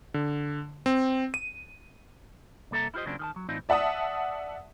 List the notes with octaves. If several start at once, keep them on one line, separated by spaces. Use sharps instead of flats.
D3
C4
D#7
C2 A#3 A4 E5 A#5
E4 F4 G4 C5 D#5
C#3 F#3 A#3 C4 D4 F4
D#3 G#4 A5
F#3
A2 E3 C4 D4 D#4 F4
D5 E5 F#5 A5 D#6